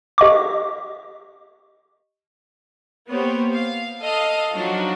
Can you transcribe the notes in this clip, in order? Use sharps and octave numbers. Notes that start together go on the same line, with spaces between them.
G4 D#5 C#6 D6
A#3 B3 G4 C5 C#5
F5
A4 D#5 F5
F3 F#3 D4 D#4 F#4